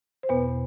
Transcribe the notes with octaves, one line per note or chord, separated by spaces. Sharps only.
C5
E2 B2 B3 B4